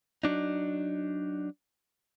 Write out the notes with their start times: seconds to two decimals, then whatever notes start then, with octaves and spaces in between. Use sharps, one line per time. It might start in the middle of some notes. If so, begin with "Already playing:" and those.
0.24 F#3 D4 D#4